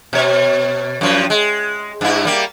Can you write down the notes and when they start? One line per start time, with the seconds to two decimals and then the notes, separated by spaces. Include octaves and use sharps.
0.13 B2 C#5
1.01 F#2 F3
1.30 G#3
2.01 G2 E4
2.25 G3 A#3